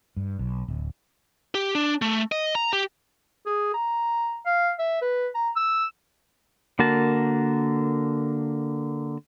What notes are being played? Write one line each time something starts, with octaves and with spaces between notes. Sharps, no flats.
G2
B1
D1
G4
D4
A3
D#5
A#5
G4
G#4
A#5
F5
E5
B4
A#5
E6
D3 A#3 F#4 A#4 A5